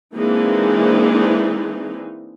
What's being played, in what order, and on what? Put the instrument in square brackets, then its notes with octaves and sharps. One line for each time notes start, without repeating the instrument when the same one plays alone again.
[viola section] E3 G#3 A#3 C4 D4 D#4